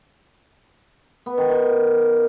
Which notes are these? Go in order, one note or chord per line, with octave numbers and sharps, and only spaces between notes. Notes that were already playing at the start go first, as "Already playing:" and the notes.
B3
D#3
D#3